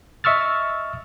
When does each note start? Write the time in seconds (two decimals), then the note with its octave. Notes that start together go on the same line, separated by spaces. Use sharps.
0.24 D#5 E5 C#6 E6 F6 A6